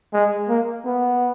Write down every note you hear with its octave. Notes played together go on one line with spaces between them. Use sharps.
G#3
A#3
B3